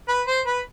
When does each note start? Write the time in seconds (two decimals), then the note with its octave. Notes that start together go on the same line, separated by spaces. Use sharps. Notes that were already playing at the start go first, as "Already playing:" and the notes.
0.08 B4
0.27 C5
0.46 B4